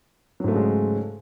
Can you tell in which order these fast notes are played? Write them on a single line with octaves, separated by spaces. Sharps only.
F#3 G#2 A3 C#3 G#3